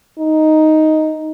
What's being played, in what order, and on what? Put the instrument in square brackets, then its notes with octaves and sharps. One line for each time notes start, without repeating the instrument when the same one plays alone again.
[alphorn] D#4